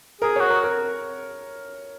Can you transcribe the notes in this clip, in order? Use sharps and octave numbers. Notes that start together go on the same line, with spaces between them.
G#4 A#4
F#4 C#5
A#4
A#4